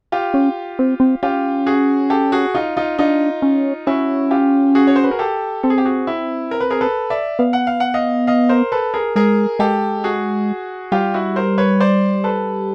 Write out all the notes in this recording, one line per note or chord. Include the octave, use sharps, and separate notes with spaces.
F4 G4
C#4
C4
C4
C#4 F4 G4
F#4 G#4
G4 A4
F#4 G#4
D#4 F4
D#4 F4
D4 D#4 F4
C#4
C#4 E4 F#4
F4 G4
F#4 G#4
C#5
C5
B4
A#4
G4 A4
C4 A4
G#4
G4
F#4 G#4
E4
A#4
B4
G#4 A#4
A4 B4
D5 E5
B3 F5
F#5
F5
F#5
D#5 F5
D#5 F5
A#4 C5
A4 B4
G#4 A#4
G#3 G#4 A#4
G#3 G4 A4
F#4 G#4
G3 F4 G4
E4 F#4
A#4 C5
B4 C#5
C5 D5
A4 B4